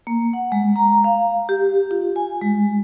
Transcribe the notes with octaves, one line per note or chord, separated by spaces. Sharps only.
A#3
F#5
G#3
A#5
F5
G4
F4
G#5
G#3